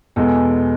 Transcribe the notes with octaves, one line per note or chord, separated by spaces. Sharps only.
E2 B2 G#3 B3 A4